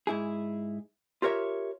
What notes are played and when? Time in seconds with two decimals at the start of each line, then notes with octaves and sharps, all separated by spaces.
0.07 G#2 E4 G#4
1.22 F4 G4 A#4 C#5 E5